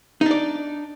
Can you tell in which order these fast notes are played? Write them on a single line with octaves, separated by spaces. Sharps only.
D#4 D4 D5